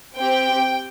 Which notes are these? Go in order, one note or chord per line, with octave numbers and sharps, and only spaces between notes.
C4 G4 G5